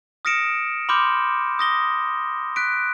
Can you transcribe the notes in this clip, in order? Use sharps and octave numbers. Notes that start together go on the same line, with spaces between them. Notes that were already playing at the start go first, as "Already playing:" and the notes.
D#6 F6 A#6 C#7 D7 E7
B5 C6 D6 F6 G6
D#6 A#6 G7
F#6 B6 D7